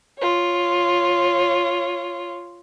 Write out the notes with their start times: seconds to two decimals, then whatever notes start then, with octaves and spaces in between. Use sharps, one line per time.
0.18 F4 C#5